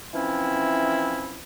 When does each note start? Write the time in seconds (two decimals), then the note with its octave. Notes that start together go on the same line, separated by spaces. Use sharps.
0.13 E3 F3 C4 C#4 E4